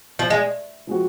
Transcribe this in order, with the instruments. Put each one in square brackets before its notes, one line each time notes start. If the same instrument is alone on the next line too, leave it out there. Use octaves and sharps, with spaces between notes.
[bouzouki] F3
G#3
[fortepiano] F3 G#3 C4 F#4